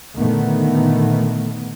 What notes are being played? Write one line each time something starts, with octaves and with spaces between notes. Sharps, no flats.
A#2 D3 D#3 A3 B3